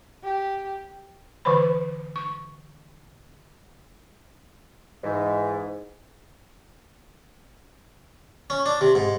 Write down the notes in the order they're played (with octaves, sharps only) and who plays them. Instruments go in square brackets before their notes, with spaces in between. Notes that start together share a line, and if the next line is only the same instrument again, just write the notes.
[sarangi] G4
[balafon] D3 E3 B4 C5 B5
C#6
[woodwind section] G#2 E3
[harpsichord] C#4
D4
C3
G#2